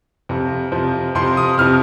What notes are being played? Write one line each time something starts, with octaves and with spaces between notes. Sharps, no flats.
F2 C3 F3
F2 C3 F3
F2 C3 F3 C6
D#6
F2 C3 F3 F6